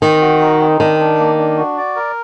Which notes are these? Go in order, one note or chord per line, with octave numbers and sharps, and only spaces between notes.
D#3 C4
F#4
D#4
C4
D#3 D4
D4
A#3
D4
F#4
D5
A#4